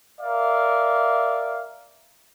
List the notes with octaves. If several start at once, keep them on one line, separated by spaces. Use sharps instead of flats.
A#4 D5 E5 F5